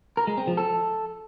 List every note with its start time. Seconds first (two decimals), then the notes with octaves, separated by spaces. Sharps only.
0.17 A#4
0.27 G#3
0.37 C4
0.47 F3
0.57 A4